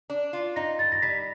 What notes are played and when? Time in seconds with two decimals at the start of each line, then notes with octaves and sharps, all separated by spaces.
0.10 D4
0.33 F4
0.56 D#4 A#6
0.79 G3 A6
0.92 A#6
1.02 G3 B6